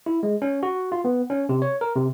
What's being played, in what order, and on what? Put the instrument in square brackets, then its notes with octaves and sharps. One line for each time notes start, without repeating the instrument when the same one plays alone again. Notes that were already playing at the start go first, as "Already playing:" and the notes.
[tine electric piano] E4
G#3
C#4
F#4
F4
B3
C#4
C3
C#5
A#4
C3